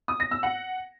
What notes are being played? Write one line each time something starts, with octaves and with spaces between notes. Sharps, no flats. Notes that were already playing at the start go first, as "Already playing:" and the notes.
D#6
A#6
E6
F#5